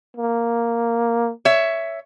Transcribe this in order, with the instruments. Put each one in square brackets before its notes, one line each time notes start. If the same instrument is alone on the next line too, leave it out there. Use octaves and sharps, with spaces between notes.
[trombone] A#3
[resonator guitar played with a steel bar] C#5 E5